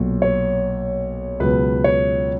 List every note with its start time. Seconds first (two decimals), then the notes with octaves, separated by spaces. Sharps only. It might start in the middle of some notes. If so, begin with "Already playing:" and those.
Already playing: B1 A#2 F#3
0.22 C#5
1.40 C#2 B2 F#3 B4
1.84 C#5